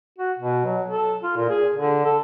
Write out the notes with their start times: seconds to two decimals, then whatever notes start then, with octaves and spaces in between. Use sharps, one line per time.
0.19 F#4
0.39 B2
0.66 F#3
0.88 A4
1.23 F4
1.37 A#2
1.50 G#4
1.76 D3
2.05 A4